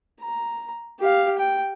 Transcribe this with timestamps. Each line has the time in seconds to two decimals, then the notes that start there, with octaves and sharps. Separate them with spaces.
0.21 A#5
1.00 G4 F5
1.38 G5